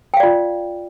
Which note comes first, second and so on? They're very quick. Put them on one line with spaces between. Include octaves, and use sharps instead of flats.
G5 F5 D5 F4